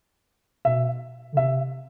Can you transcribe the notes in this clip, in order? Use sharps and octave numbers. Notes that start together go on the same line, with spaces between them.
B2 E5
D3
C3 E5